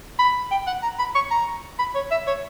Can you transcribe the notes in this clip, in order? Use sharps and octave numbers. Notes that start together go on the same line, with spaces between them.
B5
G5
F#5
A#5
B5
C#6
A#5
B5
C#5
E5
C#5